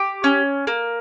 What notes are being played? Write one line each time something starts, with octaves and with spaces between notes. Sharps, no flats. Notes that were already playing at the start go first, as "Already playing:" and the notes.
Already playing: G4 D6
C#4
A#3